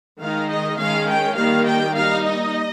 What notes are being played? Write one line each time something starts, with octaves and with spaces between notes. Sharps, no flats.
D#3 G#3 D#4 F5
D#5
D#3 G#3 C#4 F5
G5
D#3 G3 A#3 D#4 F5
G5
G3 A#3 D#4 F5
D#5